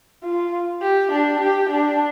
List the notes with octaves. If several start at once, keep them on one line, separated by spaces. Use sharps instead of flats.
F4
G4
D4
G4
D4